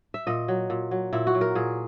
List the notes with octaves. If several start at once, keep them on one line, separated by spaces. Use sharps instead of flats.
E5
A#2 D#5
F#3
A#2
F#3
A#2 E4
F#4
F#3
A#4
A#2 G#4